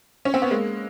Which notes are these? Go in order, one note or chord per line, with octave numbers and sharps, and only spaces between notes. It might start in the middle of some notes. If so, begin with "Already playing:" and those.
C#4
C4
B3
G#3 A#3